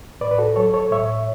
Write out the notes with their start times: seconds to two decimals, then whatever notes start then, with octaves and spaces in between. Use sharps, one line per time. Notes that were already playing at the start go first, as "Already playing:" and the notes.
0.21 A2 B4 D5
0.31 B4
0.38 F#4 A4
0.56 F#3 A4 C#5
0.74 A4 C#5
0.91 A2 C#5 E5